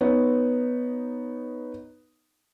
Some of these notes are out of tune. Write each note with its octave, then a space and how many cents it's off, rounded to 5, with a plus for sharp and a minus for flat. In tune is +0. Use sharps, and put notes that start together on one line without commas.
B3 +0 D#4 +0 C#5 +0